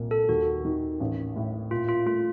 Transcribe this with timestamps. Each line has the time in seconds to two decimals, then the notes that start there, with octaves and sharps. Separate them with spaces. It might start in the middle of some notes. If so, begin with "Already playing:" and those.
Already playing: C2 A#2
0.11 A4
0.29 D#2 F#4
0.65 D#3
1.00 A1
1.36 A2
1.71 A#2 F4
1.89 F4
2.06 A3 F4